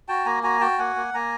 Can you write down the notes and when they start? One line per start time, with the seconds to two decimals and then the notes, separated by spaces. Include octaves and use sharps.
0.08 F#4 G5 A5
0.25 A#3 G#5 A#5
0.43 F#4 G#5 A#5
0.61 F#4 G5 A5
0.79 A#3 F#5 G#5
0.96 A#3
1.14 A#3 G#5 A#5